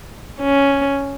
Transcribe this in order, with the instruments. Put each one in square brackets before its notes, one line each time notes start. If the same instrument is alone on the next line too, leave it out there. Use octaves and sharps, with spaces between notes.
[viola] C#4